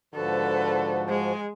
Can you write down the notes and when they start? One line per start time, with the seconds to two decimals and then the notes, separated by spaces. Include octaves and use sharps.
0.14 G#2 D3 F3 F#4 A4 B4
1.08 G#3 G#5